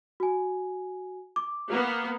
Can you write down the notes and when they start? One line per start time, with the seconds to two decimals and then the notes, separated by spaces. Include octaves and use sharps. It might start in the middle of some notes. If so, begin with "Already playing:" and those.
0.20 F#4 G#5
1.36 D6
1.71 A#3 B3